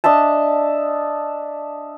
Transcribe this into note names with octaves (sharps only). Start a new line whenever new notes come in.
D4 D#5 E5 A5